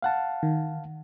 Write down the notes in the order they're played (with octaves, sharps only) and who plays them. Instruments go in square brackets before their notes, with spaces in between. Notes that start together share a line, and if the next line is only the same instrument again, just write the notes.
[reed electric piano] F5 F#5 A5
[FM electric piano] D#3